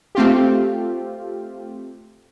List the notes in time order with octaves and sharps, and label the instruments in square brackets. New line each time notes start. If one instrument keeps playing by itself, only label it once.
[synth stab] A3 C4 F4 G4